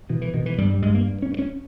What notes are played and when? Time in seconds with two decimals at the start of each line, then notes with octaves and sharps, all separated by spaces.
0.09 B2 E3
0.22 E3
0.34 B2 D#3
0.46 E3
0.58 G2 G3
0.70 G3
0.82 G2 G#3
0.94 A#3
1.06 G2
1.22 C#4
1.31 G2
1.39 C#4